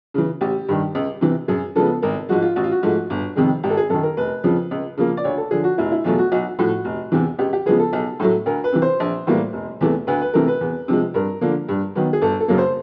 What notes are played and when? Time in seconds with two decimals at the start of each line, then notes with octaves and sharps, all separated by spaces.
0.14 C#3 E3
0.41 A1 G4
0.69 G2 D#3
0.95 C#2
1.21 C3 E3
1.48 F#2 G#4
1.76 C#3 F3 G#3 B3 A4
2.02 G#1 A#4
2.29 G#2 F3 G#3 F#4
2.42 F4
2.55 A1 F#4
2.64 F4
2.72 F#4
2.83 G#2 F3 A3
3.10 G1
3.36 F2 C3 D#3 G#3
3.63 G#1 G4
3.70 A4
3.77 G#4
3.90 F#2 D#3 A4
4.03 A#4
4.17 F1 B4
4.44 F2 C#3 F3
4.71 C#2
4.98 C#3 F3 A#3
5.17 D5
5.24 D2 C#5
5.38 A4
5.51 D3 F3 G#4
5.64 F#4
5.78 F1 E4
5.92 E4
6.04 E2 B2 F#3 A3 F4
6.18 F#4
6.32 B1 F#4
6.59 A2 F3 F#4
6.85 F1
7.12 E2 C3 E3
7.39 C#2 G4
7.53 G4
7.66 C#3 F3 G#3 B3 G#4
7.80 A4
7.93 B1
8.20 A2 F#3 A3
8.46 D2 A#4
8.64 B4
8.73 C3 E3
8.82 C5
9.00 A#1
9.27 A2 E3 G3 A#3
9.53 F1
9.81 E2 C3 E3 A3
10.07 D2 B4
10.21 B4
10.34 C3 E3 A3 A#4
10.48 B4
10.61 E2
10.88 C3 F3 G#3
11.14 G2 A#4
11.41 D3 F3 A#3
11.69 G2
11.95 D#3 F#3 B3
12.13 G#4
12.22 G1 A4
12.40 A4
12.48 F#2 C#3 F#3 A#3
12.58 C5